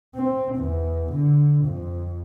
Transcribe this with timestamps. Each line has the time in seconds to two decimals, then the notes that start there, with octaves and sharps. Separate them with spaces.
0.15 C4
0.55 E2
1.12 D3
1.65 F2